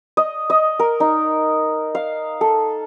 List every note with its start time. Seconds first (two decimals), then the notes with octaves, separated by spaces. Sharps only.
0.17 D#5
0.50 D#5
0.79 A#4
1.00 D#4
1.95 F5
2.41 A4